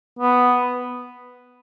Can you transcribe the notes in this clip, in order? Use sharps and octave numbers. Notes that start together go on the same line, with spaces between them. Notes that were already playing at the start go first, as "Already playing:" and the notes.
B3